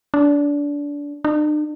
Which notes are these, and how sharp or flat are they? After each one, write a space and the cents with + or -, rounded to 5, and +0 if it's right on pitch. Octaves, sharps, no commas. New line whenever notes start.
D4 -25
D4 +45